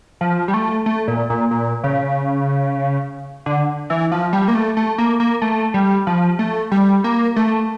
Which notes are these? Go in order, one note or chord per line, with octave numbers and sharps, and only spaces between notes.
F3
G3
A3
A3
A#2
A#2
A#2
C#3
D3
E3
F3
G3
A#3
A3
A3
A#3
A#3
A3
G3
F3
A3
G3
A#3
A3